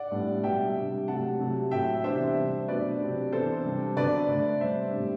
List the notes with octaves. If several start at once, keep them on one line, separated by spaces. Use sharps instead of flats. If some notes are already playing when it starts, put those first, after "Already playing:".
Already playing: D5 F#5
A2 G3 B3 D4
B2 G3 B3 E5 G5
C3 G3 D4
C3 F#3 A3 F#5 A5
C3 F#3 A3
A2 F#3 A3 E5 G5
C3 E3 B3 D4 C5 E5
C3 G3 C4
B2 F#3 A3 D4 B4 D5
C3 F#3 C4
E3 B3 D4 A4 C5
C3 G3 D4
D3 F#3 B3 B4 D5
D3 A3 D4
C3 G3 C4 C5 E5
A2 G3 B3 D4